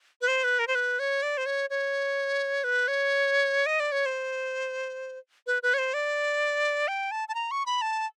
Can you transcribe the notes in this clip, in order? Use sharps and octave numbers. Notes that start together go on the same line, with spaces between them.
B4
C5
B4
A#4
C5
B4
C#5
D5
C5
C#5
C#5
B4
C#5
D#5
D5
C#5
C5
B4
B4
C#5
C5
D5
G5
A5
A5
A#5
C#6
B5
A5